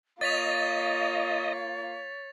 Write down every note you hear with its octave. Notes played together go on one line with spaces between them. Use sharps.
A#3 F4 C#5 D#5 A6 B6 F7